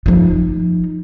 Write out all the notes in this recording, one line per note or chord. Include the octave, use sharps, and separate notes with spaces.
F3 D#4